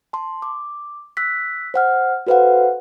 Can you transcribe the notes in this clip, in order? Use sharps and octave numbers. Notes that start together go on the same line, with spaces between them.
A5 C6
D6
E6 F#6 B6
C5 F#5 F6
F#4 A4 B4 C5 F5 F#5